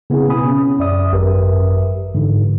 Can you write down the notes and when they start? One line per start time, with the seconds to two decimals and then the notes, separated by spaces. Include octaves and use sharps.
0.10 C#3 B3 C4 E4 G#4
0.29 B2 B3 G#5 B5 D#6
0.45 C#4
0.79 F#2 D5 E5 D#6
1.12 G#1 F#2 G4 A#4 B4 E5
2.15 G#2 D3 E3